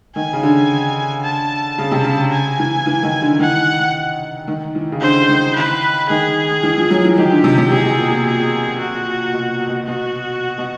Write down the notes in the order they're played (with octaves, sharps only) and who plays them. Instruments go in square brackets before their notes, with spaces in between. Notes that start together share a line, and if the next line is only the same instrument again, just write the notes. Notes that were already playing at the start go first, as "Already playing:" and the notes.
[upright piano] D#3 [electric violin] G#5
[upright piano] C#3
D3
[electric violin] A5
[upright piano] C#3
C3
C#3
[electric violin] G#5
[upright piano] E3
E3
D#3
D3
[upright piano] D#3 [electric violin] F#5
[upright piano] D#3
E3
C#3
[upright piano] D3 [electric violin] C5
[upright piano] D3
D#3
[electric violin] B4
[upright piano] D#3 [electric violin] G#4
[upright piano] E3
F3
F#3
E3
[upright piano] D#3 [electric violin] G4
[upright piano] D3
C3
C3
[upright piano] C3 [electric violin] G#4
[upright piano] B2
A#2
A#2
[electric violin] G#4
F#4
[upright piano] B2
B2
[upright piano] B2 [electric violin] F#4
[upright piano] B2